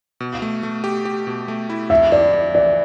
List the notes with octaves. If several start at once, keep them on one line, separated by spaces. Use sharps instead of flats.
B2
A3
A3
G4
G4
B2
A3
E4
F2 E5
F2 D5
F2
E3 D5